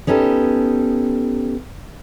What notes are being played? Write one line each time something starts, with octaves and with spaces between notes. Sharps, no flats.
B3 C#4 D#4 G4 A4